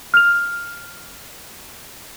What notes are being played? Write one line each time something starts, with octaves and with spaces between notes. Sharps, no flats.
F6 F7